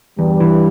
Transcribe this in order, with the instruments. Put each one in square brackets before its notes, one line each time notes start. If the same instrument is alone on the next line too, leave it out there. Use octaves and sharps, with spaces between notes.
[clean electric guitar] E2 [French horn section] G2 G3
[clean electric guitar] E3